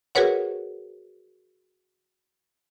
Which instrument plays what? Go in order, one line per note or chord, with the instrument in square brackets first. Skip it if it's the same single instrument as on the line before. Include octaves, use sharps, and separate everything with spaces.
[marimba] F#4 G#4 A#4 B4 C#5 F#5